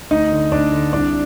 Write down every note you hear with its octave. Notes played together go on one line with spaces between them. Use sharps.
D2 D#4 D#5
D3
D2 D4 D5
D3
C2 D4 D5